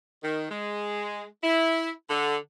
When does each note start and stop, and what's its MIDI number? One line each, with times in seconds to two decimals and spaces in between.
0.23 0.47 51
0.50 1.24 56
1.43 1.90 64
2.09 2.36 50